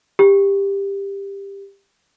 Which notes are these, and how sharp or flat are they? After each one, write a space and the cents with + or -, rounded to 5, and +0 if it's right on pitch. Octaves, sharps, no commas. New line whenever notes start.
G4 +15